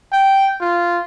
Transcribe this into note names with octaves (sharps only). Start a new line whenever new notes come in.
G5
F4